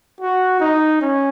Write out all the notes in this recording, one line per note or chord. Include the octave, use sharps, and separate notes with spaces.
F#4
D#4
C#4